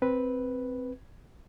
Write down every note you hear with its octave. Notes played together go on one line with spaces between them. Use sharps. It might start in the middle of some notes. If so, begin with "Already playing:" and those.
C4 B4